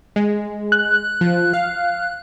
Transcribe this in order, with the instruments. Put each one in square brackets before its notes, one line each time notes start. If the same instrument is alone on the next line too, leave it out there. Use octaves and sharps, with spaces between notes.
[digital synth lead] G#3
[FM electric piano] F#6
[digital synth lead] F3
F5